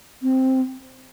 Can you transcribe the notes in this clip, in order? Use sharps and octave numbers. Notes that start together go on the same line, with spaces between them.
C4